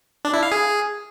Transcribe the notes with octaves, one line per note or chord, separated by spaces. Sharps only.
D4
E4
F5
G#4